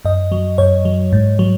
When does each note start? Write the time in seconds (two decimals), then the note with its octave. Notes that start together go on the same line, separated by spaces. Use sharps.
0.05 F#2 D#5
0.32 F#3
0.58 F#2 C#5
0.85 F#3
1.13 G#2
1.39 F#3